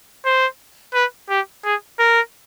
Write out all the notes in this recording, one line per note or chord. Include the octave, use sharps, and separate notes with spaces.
C5
B4
G4
G#4
A#4